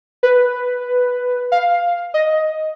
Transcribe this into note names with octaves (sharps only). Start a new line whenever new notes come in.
B4
F5
D#5